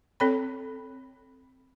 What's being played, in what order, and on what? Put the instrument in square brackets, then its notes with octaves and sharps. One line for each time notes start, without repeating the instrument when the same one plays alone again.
[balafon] C4 A4 C#5 G5 B5